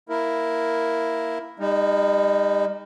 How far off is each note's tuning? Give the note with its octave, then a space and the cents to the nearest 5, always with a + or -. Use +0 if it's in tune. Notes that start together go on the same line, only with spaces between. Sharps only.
A#3 +0 E4 +0 A#4 +0
G3 +40 D#4 -5